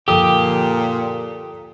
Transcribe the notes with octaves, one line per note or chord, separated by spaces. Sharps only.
F#2 A#2 D3 F3 G4 A4 D#6